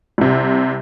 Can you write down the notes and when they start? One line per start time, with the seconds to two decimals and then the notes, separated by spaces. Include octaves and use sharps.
0.18 C2 C3